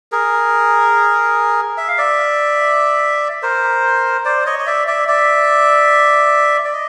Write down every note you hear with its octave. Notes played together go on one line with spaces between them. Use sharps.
G#4 A#4
E5
F5
D5 E5
A#4 C5
C5 D5
C#5 D#5
D#5
D5 E5
D5 E5
D5 E5
D5
D#5